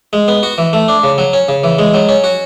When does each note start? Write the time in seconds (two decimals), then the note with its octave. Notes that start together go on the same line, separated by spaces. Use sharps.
0.13 G#3
0.28 B3
0.43 F#4
0.58 E3
0.73 A3
0.88 D4
1.04 C#3
1.18 F#3
1.33 C#4
1.49 C#3
1.64 E3
1.79 G#3
1.94 F#3
2.09 C#4
2.24 F#4